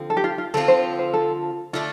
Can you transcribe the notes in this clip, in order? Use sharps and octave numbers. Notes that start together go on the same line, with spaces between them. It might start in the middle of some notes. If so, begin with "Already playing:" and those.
Already playing: D3 F3 C4
A4
G4
F4
F4
D3 F3 C4 F4 A4
C5
C5
A4
D3 A3 D4 F4